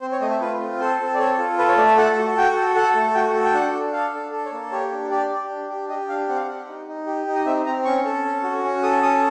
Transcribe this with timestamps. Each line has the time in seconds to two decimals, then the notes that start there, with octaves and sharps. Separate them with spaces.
0.01 C4 C5
0.12 C#5
0.21 A3 D#5
0.31 E5
0.41 F4 B4
0.60 C4
0.80 A4 C5
1.00 C4
1.14 D5
1.19 A4 C#5
1.38 F4
1.58 A4 B4
1.68 C#5
1.77 A3 D5
1.87 E5
1.97 A4 F#5
2.17 F#4
2.37 F#4 G5
2.56 A4
2.75 A4 F#5
2.95 A3
3.15 F#4 G5
3.35 A4
3.45 G5
3.54 D4 F#5
3.73 D4
3.93 A4 F5
4.14 D4
4.32 A4
4.45 C#5
4.52 A#3
4.72 G4 C#5
4.92 D4
5.11 G4 D5
5.30 G4
5.50 D4
5.70 G4
5.89 G4 D#5
6.09 D4 F5
6.28 C4 F#5
6.36 F5
6.43 G4 F#5
6.67 D#4
6.88 D#4
7.07 G4
7.27 D#4
7.35 D#5
7.46 C4 E5
7.66 C4 A#5
7.85 C#4 C#6
8.05 A4
8.24 C#4
8.44 F#4
8.63 C#4
8.83 A4 D#6
9.03 C#4 D#6